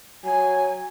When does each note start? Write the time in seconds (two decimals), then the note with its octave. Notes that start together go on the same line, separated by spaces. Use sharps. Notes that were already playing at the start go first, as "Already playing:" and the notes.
0.24 F#3 G#5